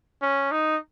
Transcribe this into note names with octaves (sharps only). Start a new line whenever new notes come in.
C#4
D#4